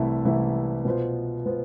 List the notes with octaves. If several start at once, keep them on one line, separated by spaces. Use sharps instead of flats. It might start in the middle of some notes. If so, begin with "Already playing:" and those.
Already playing: C2 C3 E3 A3 E4
C2 C3 E3 A3 E4
B2 B3 F4 C5
B2 B3 F4 C5